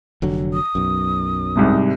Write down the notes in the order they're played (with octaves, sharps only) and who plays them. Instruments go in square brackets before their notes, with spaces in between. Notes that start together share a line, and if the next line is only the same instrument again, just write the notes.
[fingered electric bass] F1 D3 F#3
[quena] D#6
[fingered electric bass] B1 F#2
[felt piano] C2 G#2 C3